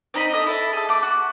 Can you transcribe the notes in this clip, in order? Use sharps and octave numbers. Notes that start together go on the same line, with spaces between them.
C4 D#4 D#5 B5
A4 D#5
E4 A4 E5
G#4 A4
A3 D6
F#4